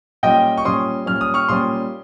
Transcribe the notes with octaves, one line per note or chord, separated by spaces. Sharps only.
A#2 G3 C#4 D#5 G5
C#6
A#2 G3 C#4 C6 D#6
A#2 G3 C#4 F6
D#6
C#6 F6
A#2 G3 C#4 C6 D#6